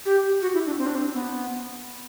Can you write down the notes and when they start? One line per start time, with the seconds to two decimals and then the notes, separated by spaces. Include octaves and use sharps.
0.06 G4
0.42 F#4
0.54 E4
0.66 D4
0.78 C4
0.87 D4
0.95 C4
1.13 B3